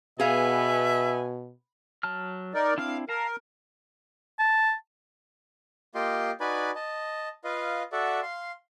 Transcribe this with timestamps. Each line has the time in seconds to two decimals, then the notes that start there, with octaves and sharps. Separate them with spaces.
0.20 B2 B3 G#4 E5 F5 G#5
2.03 F#3 A5 F6
2.54 D#4 A#4 D5
2.78 C4 D4 E4 F5
3.09 A#4 F5 A5 A#5
4.39 A5
5.95 A#3 F4 G4 D#5 G5 C6
6.40 D#4 F#4 B4 D5 G#5 B5
6.75 D#5 A5
7.44 F4 B4 D#5 F5
7.92 F#4 A4 D5 E5 F#5
8.23 F5 C6